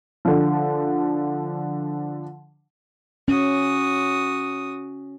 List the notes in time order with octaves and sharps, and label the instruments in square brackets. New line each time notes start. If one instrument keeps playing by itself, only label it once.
[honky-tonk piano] D3 F3
[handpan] C#4 [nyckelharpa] F#4 D#6